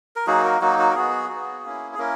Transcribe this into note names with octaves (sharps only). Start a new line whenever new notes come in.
A#4
F#3 A#3 D#4 F#4 G#4
A#4
F#3 A#3 D#4 F#4
F#4
A#4
B3 F#4 G#4
B3 F#4
A#3 C#4 E4
G#4
A#3 C#4 E4 A#4